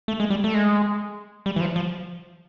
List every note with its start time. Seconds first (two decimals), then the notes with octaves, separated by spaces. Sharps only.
0.08 A3
0.20 G#3
0.30 G3
0.44 A3
0.54 G#3
1.46 G3
1.56 E3
1.61 F3
1.76 F3